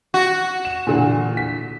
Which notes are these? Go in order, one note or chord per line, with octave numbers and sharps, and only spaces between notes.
F#4
E7
A#2 D3 E3
B6